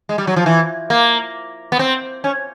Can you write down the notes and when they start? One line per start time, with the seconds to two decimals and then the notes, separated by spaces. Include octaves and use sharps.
0.09 G#3
0.18 G3
0.27 F#3
0.36 F3
0.46 E3
0.90 A#3
1.72 B3
1.79 C4
2.24 C#4